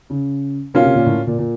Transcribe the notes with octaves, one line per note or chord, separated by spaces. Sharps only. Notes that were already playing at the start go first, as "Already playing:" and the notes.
C#3
B2 A#3 C#4 F4
C3
A#2
A2
A#2
A#2